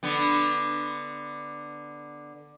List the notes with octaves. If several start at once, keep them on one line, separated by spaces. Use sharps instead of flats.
D3 B3